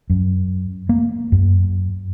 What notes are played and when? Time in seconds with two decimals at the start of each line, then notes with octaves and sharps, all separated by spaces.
0.10 F#2
0.89 A#3
1.32 F#2